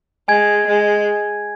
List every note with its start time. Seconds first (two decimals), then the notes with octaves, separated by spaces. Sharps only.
0.28 G#3 G#5 G#6
0.68 G#3